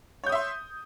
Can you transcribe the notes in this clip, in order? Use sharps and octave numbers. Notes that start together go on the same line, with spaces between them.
C#5 E5 C6 D#6 G6